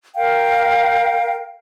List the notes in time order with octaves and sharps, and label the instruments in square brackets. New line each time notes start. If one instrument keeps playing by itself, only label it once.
[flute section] A#4 F5 G5